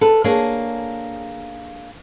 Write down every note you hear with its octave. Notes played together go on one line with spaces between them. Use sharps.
A4 B4
A#3 D4 G#4 C#5